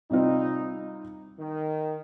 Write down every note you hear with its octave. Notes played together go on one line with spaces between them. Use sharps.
C3 G3 C4 D#4 F4
D#3